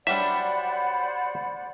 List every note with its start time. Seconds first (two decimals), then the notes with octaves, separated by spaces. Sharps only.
0.07 F#3 G3 D4 C5 D5 E5 F#5 B5